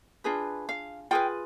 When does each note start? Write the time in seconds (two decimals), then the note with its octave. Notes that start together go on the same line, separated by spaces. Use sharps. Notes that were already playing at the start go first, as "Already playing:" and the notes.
0.24 D4 F4 G#4 B4
0.69 F5
1.11 F4 G#4 B4 G5